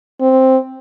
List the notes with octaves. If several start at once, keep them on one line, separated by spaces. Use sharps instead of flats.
C4